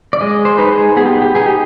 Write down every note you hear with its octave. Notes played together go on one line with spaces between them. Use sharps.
D5
G#3 D#5
C5
D#4 B4
G#4
B3 G#4
G4
G4
D#4 G#4
G4